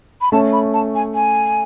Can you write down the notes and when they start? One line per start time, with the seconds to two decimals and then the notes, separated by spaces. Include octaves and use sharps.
0.21 B5
0.32 A3 C#4 A5
0.53 B5
0.73 A5
0.95 G#5
1.14 G#5